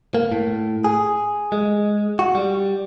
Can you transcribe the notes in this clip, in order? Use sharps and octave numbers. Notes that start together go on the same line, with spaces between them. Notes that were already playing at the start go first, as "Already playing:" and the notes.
A#3
A2
G#4
G#3
F#4
G3